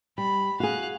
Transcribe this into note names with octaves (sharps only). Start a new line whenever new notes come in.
G3 B5
F#4 G#4 F5 F#6